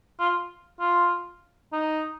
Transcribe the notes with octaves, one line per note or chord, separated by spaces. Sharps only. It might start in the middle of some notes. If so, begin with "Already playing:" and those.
F4
F4
D#4